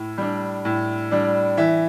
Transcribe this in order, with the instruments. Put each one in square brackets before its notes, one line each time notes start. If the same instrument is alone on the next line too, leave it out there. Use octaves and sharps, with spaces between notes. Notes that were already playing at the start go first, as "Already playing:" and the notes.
Already playing: [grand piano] A2
G3 D4
A2
G3 D4
E3 E5